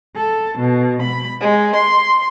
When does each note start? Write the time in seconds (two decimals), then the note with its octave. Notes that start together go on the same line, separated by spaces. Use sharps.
0.15 A4
0.58 B2
1.00 B5
1.40 G#3
1.75 C6